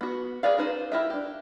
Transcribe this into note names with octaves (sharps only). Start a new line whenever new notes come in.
B3 F#4
G#4 B4 D5 F5
C#4 D#4 B4 C5
E4 G4 A#4 B4 E5
D4 G4